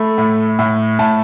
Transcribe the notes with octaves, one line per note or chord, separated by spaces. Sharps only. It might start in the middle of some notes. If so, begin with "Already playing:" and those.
Already playing: A3 B5
A2
A2
A2 A5